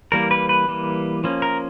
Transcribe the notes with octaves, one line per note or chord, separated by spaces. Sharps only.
E3 G3 A#3 A#4
B4
B4
E3 G3 A#3
F3 A#3 C#4
A#4